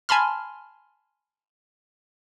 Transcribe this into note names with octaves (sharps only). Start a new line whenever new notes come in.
G#5 A5 B5 C6 F6